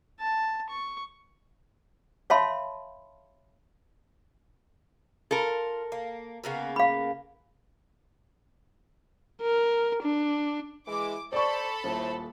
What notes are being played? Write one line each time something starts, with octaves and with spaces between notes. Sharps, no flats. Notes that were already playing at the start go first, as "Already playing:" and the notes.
A5
C#6
C#5 E5 F5 A5 B5 C6
F4 A4 A#4
A#3
C#3 A#3 B3
F5 B5
A#4
D4
E3 G#3 D6
A4 C5 D5 A5 B5 C#6
D#1 A2 C5